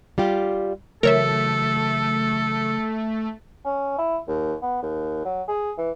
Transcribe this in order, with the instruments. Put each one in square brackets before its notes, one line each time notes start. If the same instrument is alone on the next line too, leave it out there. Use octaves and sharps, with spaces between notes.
[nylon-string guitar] G3 F4 G4
[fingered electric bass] C#3 E3 F#3 [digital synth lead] A3 [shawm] A4 [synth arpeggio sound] A#4 C#5 E5
[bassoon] C#4
E4
D#2
B3
D#2
F#3
G#4
E3